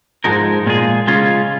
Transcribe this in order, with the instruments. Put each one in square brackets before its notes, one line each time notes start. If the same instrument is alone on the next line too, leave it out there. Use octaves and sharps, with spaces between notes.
[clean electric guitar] G#2 F3 G#3 D#4 A#4
A#2 G#3 F4 G#4
C#3 G#3 C#4 F4